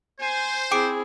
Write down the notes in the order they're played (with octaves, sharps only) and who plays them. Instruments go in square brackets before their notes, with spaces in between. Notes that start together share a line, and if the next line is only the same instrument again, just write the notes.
[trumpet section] C5 [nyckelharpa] G#5
[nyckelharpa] C4 E4 [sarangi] G#4 [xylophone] G5 D6 D7